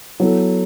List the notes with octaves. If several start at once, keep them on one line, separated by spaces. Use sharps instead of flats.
F#3 B3 E4 A4